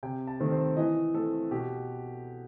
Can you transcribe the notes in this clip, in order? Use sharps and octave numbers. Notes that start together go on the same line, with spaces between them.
C3 G5
A5
D#3 A3 C4
C5
E3 D#5
A3 C4 A4
B2 G4